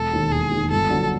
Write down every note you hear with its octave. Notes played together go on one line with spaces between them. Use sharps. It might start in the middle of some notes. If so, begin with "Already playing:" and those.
Already playing: E1 A4
D#2 D#3
E1 G#4
D#2
D#3
G1 A4
G2 D3 F#3